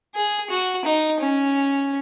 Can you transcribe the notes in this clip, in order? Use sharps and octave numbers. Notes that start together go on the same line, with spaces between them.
G#4
F#4
D#4
C#4